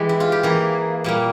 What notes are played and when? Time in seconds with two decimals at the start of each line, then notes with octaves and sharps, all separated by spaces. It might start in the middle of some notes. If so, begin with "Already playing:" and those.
Already playing: E3 G#3 G4
0.09 E4
0.20 F4
0.32 G4
0.43 E3 A#3 G#4
1.04 A#2 G3 A#3